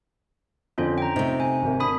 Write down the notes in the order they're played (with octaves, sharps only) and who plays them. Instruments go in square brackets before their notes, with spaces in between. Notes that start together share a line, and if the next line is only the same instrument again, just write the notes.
[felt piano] F2 D3 [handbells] C#4 F4 C5
[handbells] G5 A#5
[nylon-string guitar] C3 A3 [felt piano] D#4
[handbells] G#5
[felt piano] G#1 A#4
[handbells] D4 B5 D#6